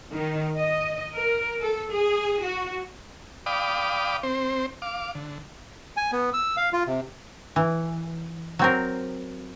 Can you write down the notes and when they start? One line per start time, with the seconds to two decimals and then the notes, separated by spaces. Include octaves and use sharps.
0.13 D#3
0.58 D#5
1.15 A#4
1.61 A4
1.91 G#4
2.44 F#4
3.46 D5 F5 G5 B5 D6 D#6
4.23 C4 C5
4.82 F5 D6
5.15 D3
5.97 G#5
6.12 B3
6.33 E6
6.57 F5
6.73 F4
6.87 C3
7.56 E3
8.59 F#3 C4 A#4